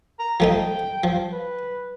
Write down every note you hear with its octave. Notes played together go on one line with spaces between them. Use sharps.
A#5
F3 A3 D#4 G5
F3
B4